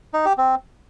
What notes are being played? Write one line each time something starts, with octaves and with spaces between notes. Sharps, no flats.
D#4
G4
C4